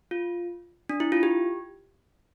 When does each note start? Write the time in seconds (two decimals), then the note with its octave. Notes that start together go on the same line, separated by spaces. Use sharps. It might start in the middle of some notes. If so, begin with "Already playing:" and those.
0.11 F4
0.89 D4
1.00 E4
1.12 F4
1.23 G4